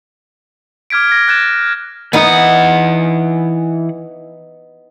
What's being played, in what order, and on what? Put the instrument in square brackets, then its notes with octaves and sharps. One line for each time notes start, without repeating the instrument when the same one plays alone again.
[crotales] D6 F6 G#6 B6 D7
G#6 A#6
F#6 G#6 A6 E7
[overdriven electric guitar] E3 F#5 [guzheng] B3 D#4